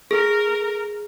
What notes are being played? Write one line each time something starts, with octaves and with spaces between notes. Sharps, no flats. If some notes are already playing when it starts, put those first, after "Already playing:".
G#4 A#4